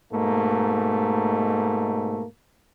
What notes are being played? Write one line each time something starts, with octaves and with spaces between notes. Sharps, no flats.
G#2 B2 A3 A#3